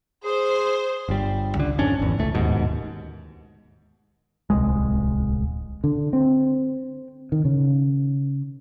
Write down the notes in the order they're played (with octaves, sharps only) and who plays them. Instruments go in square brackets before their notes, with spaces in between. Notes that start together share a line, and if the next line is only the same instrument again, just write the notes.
[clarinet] G#4 [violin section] C5
[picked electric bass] G1 G3
C#2 D3
G#1 F2 C#4 D4
G#1 E2
F#1 C#2 A3
D1 D#2 G#2 B2
D1 C2 G#3
[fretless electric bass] D3
C4
D#3
C#3